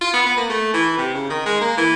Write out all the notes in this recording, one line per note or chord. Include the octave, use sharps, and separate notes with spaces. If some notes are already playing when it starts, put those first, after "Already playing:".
F4
B3
B3
A#3
A3
E3
C3
C#3
D#3
G#3
A#3
E3